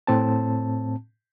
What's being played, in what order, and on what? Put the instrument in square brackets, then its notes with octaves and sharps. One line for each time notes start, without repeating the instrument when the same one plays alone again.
[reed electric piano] A2 C4 A5